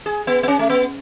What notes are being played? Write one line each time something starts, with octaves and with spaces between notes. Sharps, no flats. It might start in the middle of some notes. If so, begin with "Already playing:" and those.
G#4
B3
B3
C#4
A3
B3